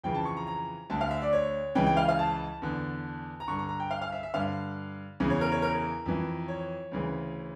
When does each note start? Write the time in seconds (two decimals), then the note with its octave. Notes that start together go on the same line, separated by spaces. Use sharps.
0.04 F2 C#3 E3 G5
0.14 A5
0.25 C#6
0.37 A#5
0.47 A#5
0.90 D2 D3 A5
1.01 F5
1.11 E5
1.22 D5
1.33 C#5
1.75 C#2 C#3 E3 G5
1.86 G5
1.97 F5
2.09 F5
2.19 A5
2.62 E2 D3
3.40 A#5
3.48 G2 D3 C#6
3.59 A#5
3.69 A#5
3.80 G5
3.91 F5
4.02 F5
4.12 E5
4.23 E5
4.34 G2 D3 F5
5.20 E2 C#3 E3
5.30 C#5
5.41 A#4
5.52 C#5
5.62 A#4
6.06 F2 E3
6.48 C#5
6.92 D2 C#3 E3